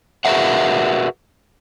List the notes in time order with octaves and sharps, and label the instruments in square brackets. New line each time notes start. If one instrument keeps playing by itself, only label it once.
[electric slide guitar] F#4 G#4 A#4 B4 E5 F#5